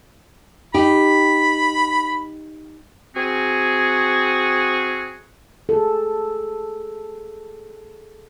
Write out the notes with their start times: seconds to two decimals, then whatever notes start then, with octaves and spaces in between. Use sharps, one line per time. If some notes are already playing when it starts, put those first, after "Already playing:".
0.74 D#4 G4 B5
3.15 C4 F#4 G#4
5.69 G#4 A4